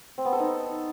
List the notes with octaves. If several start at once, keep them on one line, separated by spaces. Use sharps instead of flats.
C4
B3
A4
D#4